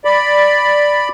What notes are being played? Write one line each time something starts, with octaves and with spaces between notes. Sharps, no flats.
D5 B5